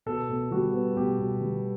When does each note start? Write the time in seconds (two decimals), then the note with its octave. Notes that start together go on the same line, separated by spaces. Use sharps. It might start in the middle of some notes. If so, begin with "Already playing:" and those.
0.06 B2 A4
0.29 B2
0.51 G3 F#4
0.73 B3
0.97 B2 G4
1.19 B2
1.41 G3